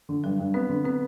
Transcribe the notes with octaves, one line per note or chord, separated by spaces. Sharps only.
D3
G2 F#3
G2
B3 C4
D3
B3 C4